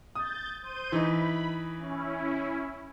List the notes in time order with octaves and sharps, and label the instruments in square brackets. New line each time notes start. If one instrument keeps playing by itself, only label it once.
[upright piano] D#6 [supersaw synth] G6 A6
[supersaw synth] C5 G6 D#7
[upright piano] E3 D#4 [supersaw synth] B5
[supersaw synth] C#4 E4